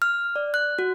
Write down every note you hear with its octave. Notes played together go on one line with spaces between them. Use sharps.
F6
D5
F#6
F#4